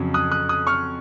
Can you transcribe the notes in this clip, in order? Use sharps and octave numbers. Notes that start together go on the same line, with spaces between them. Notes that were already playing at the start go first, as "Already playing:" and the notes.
Already playing: F2 C#3 F#3
D#6 F#6
D#6 F#6
D#6 F#6
C#6 F6